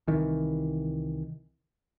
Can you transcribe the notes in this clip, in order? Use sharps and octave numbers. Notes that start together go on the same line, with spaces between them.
C2 D#3 E3